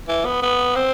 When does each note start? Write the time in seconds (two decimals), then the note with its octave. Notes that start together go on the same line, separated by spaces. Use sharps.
0.08 E3
0.25 B3
0.42 B3
0.75 C4